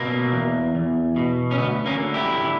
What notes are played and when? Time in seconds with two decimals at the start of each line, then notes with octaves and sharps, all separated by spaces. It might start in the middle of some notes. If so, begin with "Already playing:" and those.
Already playing: B2 A#3
0.32 E2
0.75 E2
1.16 B2
1.51 C#4
1.58 D2 B3
1.86 A#3 C#4
2.00 D3
2.14 E4 G4
2.41 D3